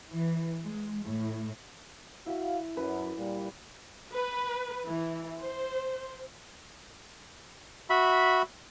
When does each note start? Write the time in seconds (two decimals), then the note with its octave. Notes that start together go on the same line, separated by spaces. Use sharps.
0.11 E3
0.64 G#3
1.05 A2
2.26 E4 F#4 F5 B5
2.77 F#2 B4
3.17 A#2 G3
4.15 B4
4.85 E3
5.40 C5
7.90 F#4 E5 B5